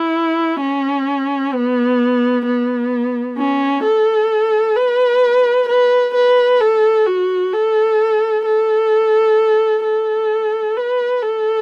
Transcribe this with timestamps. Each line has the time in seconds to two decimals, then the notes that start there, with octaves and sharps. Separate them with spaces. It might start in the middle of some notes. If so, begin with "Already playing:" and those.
Already playing: E4
0.61 C#4
1.53 B3
2.46 B3
3.38 C#4
3.84 A4
4.76 B4
5.69 B4
6.14 B4
6.61 A4
7.06 F#4
7.53 A4
8.45 A4
9.84 A4
10.77 B4
11.23 A4